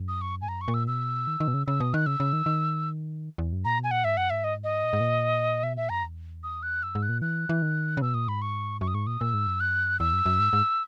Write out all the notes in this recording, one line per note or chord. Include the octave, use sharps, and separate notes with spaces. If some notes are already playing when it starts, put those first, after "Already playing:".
Already playing: F#2
D#6
C#6
G#2 G#5
F#2 A#5
C#6
A#2
E6
B2 E6
D#3
D#3
B2
C#3
C#3 E6
B2 D#6
D#3 F#6
C#3 E6
C#3
D#3
D#3
E2
F#2
A#2 A#5
B2
G#5
A#2 F#5
G#2 E5
F#2 F#5
G#2 E5
D#5
D#5
A#2
G#2
A#2
B2 E5
A#2 E5
F#2 A#5
E2
D#6
F#6
F#2 E6
G#2
F#6
A#2
E3 F#6
E3
D#3
C#3
B2 E6
A#2 D#6
G#2 B5
C#6
F#2 C#6
D#6
G#2 C#6
A#2 D#6
A#2 E6
G#2
F#2
F#6
E2 E6
F#2
F#2
G#2
G#2